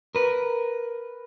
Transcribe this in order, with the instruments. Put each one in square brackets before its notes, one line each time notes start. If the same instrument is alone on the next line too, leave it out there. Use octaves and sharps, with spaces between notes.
[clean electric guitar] A#4 B4